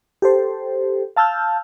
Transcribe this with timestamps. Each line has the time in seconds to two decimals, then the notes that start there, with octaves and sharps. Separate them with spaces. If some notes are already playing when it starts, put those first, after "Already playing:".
0.22 G4 A4 C5
1.16 F5 A5 E6 F6 G6